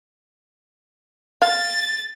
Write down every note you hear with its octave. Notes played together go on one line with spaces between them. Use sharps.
F5 A6